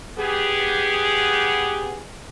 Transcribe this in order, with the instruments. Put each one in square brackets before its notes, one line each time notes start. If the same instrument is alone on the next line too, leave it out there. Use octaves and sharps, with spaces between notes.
[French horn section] B3 G4 G#4